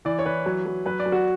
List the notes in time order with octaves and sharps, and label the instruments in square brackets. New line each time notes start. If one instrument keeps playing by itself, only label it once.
[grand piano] E3 D5
C#5
E3 B4
F#3
F#3
F#3 B4
D5
F#3
F#4